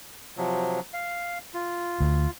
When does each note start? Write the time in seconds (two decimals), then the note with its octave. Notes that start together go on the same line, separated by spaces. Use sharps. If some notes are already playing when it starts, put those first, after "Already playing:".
0.37 C3 F3 F#3
0.93 F5
1.54 F4
2.00 D2